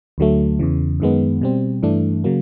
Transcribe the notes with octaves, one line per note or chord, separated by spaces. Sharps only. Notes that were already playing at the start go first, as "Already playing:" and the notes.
D2 D3 F#3 A3
E2 C#3 E3
F#2 D#3 G#3 B3
B2 G3 C4
G2 E3 A3 D4
C#3 F#3 A#3